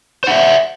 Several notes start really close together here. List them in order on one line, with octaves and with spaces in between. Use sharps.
C5 F#5 E5